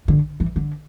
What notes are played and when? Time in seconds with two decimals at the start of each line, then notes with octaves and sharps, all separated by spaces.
0.08 D3
0.40 E3
0.56 D3